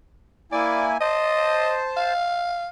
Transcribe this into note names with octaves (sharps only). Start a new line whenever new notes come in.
A#3 E4 D5 G#5
C5 D#5 A5
F5